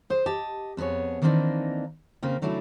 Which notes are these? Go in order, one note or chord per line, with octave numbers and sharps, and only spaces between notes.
G#4 C5
G4 D#5 A5
F2 B3 D4 G#4 C#5
D#3 E3 A#3 C4 D4 D#4
C#3 A#3 C4
C#3 F#3 A3 D4 E4